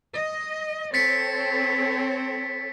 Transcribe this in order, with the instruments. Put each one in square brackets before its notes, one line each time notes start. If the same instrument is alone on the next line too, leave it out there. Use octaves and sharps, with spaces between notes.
[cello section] D#5
[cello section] C4 A4 C#5 [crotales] A6 B6 C#7